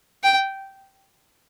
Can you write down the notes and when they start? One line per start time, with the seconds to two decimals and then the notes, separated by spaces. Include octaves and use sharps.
0.24 G5